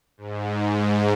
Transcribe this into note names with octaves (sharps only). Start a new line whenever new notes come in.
G#2
G#2